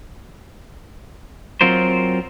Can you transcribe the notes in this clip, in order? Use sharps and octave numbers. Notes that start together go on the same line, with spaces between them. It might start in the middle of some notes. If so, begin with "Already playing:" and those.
F#3 C4 F4 A#4 C5